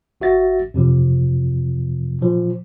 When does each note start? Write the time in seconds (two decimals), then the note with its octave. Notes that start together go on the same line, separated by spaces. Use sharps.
0.21 G#1 F#4 E5 A6 A#6
0.74 F2 C3 F3
2.21 A#2 F3